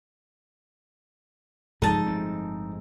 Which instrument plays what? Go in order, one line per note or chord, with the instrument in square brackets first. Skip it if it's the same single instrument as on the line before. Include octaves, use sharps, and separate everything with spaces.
[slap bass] A1 G2 C#3 [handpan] F3 G#3 A4 [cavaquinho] D#4 A5
[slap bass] G1 A2 C4